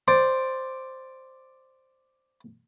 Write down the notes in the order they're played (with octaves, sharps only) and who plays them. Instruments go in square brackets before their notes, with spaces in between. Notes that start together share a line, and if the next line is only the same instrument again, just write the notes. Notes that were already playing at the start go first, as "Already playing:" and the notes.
[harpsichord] C5 D5